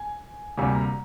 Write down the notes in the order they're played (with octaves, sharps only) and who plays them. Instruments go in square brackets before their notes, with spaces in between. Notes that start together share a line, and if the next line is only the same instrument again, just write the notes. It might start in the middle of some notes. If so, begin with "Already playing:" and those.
Already playing: [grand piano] G#5
D2 C3 G3 A#3 G#5
A#5